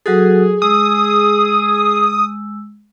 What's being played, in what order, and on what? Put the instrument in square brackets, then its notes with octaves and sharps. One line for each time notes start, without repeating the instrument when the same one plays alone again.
[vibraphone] F#3 F#4 A4 [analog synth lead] G#4
[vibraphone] G#3 E6 [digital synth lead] D#6